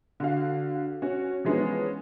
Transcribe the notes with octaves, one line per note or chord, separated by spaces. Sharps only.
D3 F#4 F5
C#4 F#4
E3 F3 G#3 B3 C#4 D#4